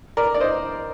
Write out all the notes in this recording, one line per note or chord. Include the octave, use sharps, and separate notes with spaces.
A#4 D5
D5
C5 D#5